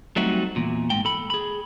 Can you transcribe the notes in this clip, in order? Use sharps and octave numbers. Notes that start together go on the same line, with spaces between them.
F#3 G3 A3 C4 D#4 F#4
E2 A#2
G#2 G5
A4 B5
G#4 B5